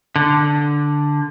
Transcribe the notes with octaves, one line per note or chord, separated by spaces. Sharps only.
D3